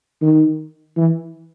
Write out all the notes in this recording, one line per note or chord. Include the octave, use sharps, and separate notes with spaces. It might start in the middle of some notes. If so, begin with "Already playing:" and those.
D#3
E3